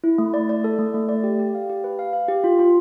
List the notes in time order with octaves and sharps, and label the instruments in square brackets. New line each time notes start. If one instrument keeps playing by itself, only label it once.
[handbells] E4
A3
D5
D5
A4
A3
A3
D5
G4
G4
F5
G4
B4
F5
F5
G4
F4
F4